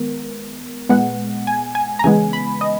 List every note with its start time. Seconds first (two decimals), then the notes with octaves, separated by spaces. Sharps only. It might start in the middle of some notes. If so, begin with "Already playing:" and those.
Already playing: D#3 G#3 B3 A#4
0.89 A#2 G#3 B3 F#5
1.47 G#5
1.75 G#5
1.99 A#5
2.04 C#3 E3 G#3 B3 G#5
2.33 B5
2.61 D#5